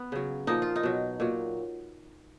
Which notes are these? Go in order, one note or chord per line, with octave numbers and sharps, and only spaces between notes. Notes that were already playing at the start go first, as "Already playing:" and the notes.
Already playing: B3
C#3 F#3
A#2 F3 D#4
F4
D#4
B2 F#3
A#2 F#3